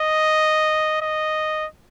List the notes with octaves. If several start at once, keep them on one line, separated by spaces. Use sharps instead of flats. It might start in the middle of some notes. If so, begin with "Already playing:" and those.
Already playing: D#5
D#5